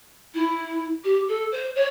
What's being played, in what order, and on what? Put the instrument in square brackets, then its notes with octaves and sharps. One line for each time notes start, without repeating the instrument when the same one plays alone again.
[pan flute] E4
G4
A4
C5
C#5